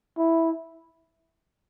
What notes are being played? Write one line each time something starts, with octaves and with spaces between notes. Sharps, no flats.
E4